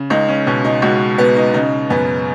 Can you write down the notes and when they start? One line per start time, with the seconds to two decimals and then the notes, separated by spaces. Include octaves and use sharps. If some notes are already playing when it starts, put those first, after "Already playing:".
Already playing: C#3
0.10 C#2 D#4
0.29 C#4
0.46 B2 C#4
0.65 D#4
0.82 C#2 F#4
1.18 B2 B3
1.36 D#4
1.54 C#3 D#4
1.90 F#2 B3